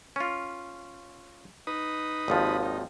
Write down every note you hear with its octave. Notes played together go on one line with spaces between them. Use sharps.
C#4 F4
D#4 B4 D#6
G#1 D#2 F3
D#4